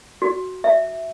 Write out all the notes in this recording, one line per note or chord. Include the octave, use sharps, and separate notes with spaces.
F#4
E5